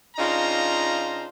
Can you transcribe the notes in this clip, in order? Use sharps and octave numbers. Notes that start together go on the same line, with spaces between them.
C#3 D4 D#4 F4 C5 A#5